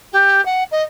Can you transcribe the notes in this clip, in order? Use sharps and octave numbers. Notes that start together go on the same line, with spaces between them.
G4
F#5
D#5